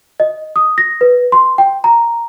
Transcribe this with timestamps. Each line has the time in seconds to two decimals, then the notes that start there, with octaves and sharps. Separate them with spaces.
0.20 D#5
0.56 D#6
0.78 A#6
1.01 B4
1.32 C6
1.58 G5
1.84 A#5